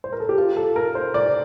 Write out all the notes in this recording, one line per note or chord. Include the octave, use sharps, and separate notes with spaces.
C5
A#4
A4
G4
F4
A4
A#4
C5
D5